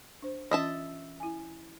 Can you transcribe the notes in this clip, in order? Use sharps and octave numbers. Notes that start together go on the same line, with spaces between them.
D4 C5
E3 C#4 F4 D#5 E5 A5
E4 G#5